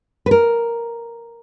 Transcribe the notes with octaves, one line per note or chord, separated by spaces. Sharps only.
B4
A#4